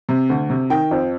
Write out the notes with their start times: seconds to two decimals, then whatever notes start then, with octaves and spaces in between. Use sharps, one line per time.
0.09 C3
0.29 D2
0.50 C3
0.70 D#3 G5
0.91 F2